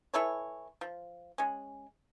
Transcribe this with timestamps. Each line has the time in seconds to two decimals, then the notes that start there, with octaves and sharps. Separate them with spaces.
0.14 E3 E4 A4 C#5
0.81 F3
1.38 G#3 C#4